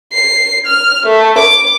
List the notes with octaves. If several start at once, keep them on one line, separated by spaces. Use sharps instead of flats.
C7
F6
A3
D6